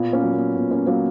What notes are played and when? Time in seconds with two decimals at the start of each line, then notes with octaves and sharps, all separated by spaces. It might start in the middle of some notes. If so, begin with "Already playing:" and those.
Already playing: A#2 B3
0.13 A#3 C#4
0.23 F#3
0.33 A#3
0.55 A#2 B3
0.70 A#3 C#4
0.87 F#3 A#3 C#4